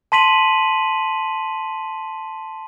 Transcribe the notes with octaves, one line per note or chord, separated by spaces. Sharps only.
A5 C6 B6 D#7 F#7